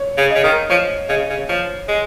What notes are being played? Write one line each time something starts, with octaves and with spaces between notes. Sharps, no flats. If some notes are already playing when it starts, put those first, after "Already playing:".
Already playing: C#5
C#3
C#3 D#5
D#3
F3 C#5
C#3 D#5
C#3
F3 C#5
G#3